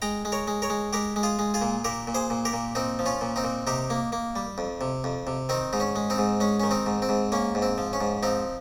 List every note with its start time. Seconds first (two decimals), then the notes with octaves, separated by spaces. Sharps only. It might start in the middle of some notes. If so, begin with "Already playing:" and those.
0.02 G#3 G5 A#5
0.25 G#3
0.32 A#4 C#5
0.47 G#3
0.62 A#4 C#5
0.70 G#3
0.93 G#3 G4 A#4
1.16 G#3
1.23 F4 G#4
1.39 G#3
1.54 F4 G#4
1.61 A#2
1.84 A#2 G4 A#4
2.07 A#2
2.15 G#4 C5
2.30 A#2
2.45 G4 A#4
2.53 A#2
2.75 A#2 C4 D#4
2.99 F3
3.06 C#4 F4
3.21 A#2
3.36 C4 D#4
3.44 A#2
3.67 C3 D#4 G4
3.90 A#3
4.12 A#3
4.36 G3
4.58 F2
4.81 C3
5.04 F2
5.27 C3
5.49 D#3 C4 D#4
5.73 G#2 D#4
5.80 C#4
5.96 G#3
6.10 C4 D#4
6.18 G#2
6.40 G#3 C#4
6.60 D#3 C#4
6.71 C4 D#4
6.86 G#2
7.02 C4
7.09 G#2
7.32 A#3 C#4
7.55 G#2
7.62 C4
7.78 F3
7.93 C#4
8.01 G#2
8.23 F3 C4 D#4